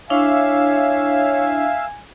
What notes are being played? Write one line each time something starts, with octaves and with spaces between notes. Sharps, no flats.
D4 E4 C#5 E5 F5 G#5